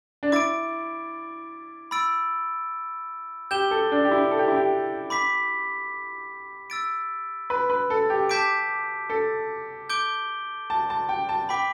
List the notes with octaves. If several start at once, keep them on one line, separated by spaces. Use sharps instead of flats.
D4
E4 D6 A6 D7
B5 E6 A6 D7
G4 G6 E7 G7
A4
D4
G4
E4
A4
G4
E4
G4
B5 D6 B6
E6 A6 D7
B4
B4
A4
G4
A5 D6 G6 B6 D7
A4
D6 G6 D7 G7
A5
A5
G5
A5
G5 B5 D6 B6